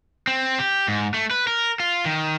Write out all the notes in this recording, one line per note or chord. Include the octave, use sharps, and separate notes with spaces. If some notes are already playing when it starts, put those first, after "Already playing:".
C4
G4
G#2
A3
B4
A#4
F4
D#3